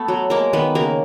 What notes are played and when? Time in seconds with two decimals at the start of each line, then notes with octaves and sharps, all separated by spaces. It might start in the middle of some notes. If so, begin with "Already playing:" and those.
Already playing: A3 B3 A4
0.08 F#3
0.30 G#3 A#3 A#4
0.53 D#3 B3 B4
0.75 C#3 A#3 A#4